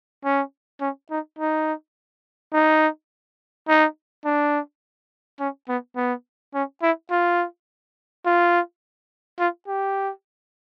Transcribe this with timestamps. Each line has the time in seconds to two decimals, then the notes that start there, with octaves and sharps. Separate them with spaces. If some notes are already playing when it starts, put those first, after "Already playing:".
0.24 C#4
0.81 C#4
1.11 D#4
1.39 D#4
2.53 D#4
3.68 D#4
4.25 D4
5.40 C#4
5.69 B3
5.96 B3
6.54 C#4
6.83 E4
7.11 F4
8.26 F4
9.39 F4
9.68 G4